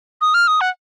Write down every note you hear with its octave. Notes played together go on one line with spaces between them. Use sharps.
D#6
F6
D#6
F#5